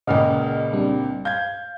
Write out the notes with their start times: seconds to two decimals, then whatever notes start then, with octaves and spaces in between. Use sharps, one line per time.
0.07 C#2 A#2 C#3 D#5 F#5 F6
0.73 G3 C4 D4
1.25 F5 G6 G#6